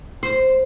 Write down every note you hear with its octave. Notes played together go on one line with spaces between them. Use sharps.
C5